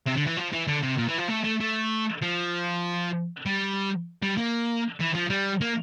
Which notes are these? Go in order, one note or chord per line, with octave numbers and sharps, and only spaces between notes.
C3
D3
E3
F3
E3
D3
C3
A#2
E3
F3
A3
A3
A3
F3
G3
G3
A#3
E3
F3
G3
A#3